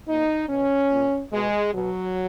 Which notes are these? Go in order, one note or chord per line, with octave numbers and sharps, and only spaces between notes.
A#2 D#4
B2 C#4
A#2
B2 G#3
B2 F#3